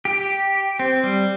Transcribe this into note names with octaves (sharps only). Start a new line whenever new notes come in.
G4
C4
G3